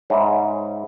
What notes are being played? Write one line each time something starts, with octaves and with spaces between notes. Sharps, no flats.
G#2 C#5 E5 G#5 B5